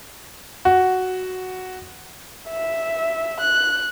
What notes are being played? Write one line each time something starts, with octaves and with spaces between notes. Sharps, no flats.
F#4
E5
F#6